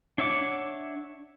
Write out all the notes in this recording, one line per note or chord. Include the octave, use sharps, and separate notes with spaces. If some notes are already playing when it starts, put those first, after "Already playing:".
D4 C#5 E5 F#5 D6